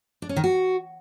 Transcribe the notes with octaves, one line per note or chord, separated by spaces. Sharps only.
D4
C#4
D#3
F#4